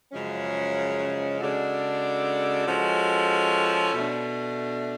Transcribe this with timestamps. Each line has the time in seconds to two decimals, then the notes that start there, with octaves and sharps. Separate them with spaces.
0.12 F#2 C#3 F3 G#3 C#4
1.40 C#3 G#3 D4 F#4 A4
2.67 F3 G#3 C#4 F#4 A4
3.94 B2 A3 D4